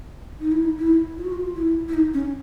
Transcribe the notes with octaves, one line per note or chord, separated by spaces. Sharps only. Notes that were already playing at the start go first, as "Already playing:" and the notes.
D#4
E4
D#4
E4
F4
F#4
F4
E4
E4
D#4
C#4